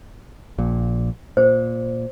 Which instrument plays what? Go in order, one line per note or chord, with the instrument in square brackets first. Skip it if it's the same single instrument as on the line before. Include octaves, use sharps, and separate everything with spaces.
[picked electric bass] A#1 A#2
[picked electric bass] A#2 [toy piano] C5